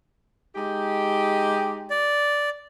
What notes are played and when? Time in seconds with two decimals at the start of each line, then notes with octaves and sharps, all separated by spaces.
0.55 G#3 D#4 G4
1.90 D5